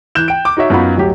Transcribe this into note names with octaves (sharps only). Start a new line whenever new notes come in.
E3 F#6 G6 E7
G5 D7
D6
D#4 F#4 C#5 E5
F#2 B3 D#4 F4 F#4 B5
D1 F#3 G4